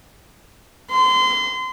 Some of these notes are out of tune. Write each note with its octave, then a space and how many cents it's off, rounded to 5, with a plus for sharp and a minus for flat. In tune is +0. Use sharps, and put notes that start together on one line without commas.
C6 -30